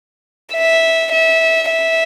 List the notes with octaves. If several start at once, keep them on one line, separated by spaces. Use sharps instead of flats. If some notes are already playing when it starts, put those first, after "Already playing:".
E5
E5
E5